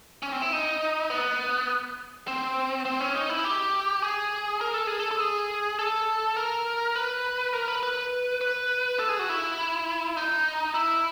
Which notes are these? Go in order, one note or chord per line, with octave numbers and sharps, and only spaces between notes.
C#4
C4
E4
D#4
B3
C4
C4
C#4
D#4
E4
G4
G#4
A#4
A4
G#4
A4
A4
G#4
A4
A#4
B4
A#4
B4
B4
B4
A4
G#4
F#4
E4
D#4
E4